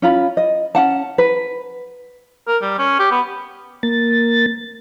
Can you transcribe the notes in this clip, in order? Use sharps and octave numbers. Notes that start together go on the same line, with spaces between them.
C#4 F4 B5
D#5
C#4 F#5 A5
B4
A#4
G3
C#4
G4
B3
A#3 A6